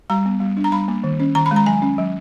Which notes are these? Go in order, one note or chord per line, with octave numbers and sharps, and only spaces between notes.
G3 A#5
B3
G3
D4
A#5
G3 B5
A#3
D#3
C#4
D#3 A#5
B5
G#3
A#5
F#3 G#5
C#4
F#3